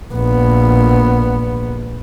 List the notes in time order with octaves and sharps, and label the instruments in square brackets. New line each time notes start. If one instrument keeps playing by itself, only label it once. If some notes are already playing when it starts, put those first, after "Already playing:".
[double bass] A#1 B3